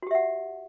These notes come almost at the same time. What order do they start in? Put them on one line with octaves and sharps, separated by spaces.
F#4 G4 E5 F#5